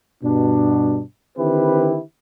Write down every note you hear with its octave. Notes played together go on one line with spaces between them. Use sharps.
G2 B2 D4
D3 D#3 C4 E4 G4 B4